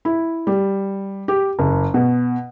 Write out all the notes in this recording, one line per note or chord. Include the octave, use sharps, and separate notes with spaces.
E4
G3
G4
F#1
B2